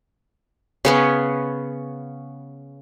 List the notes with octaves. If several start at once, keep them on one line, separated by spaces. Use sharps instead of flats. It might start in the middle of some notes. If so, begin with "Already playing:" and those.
C#3 B3 C#4